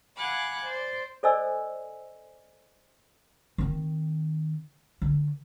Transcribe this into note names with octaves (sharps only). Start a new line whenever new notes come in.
F5 F#5 G#5 B5 D6 F#6
C5 D5 C6
A4 C5 D5 D#5 G#5 E6
D#3 C4
D3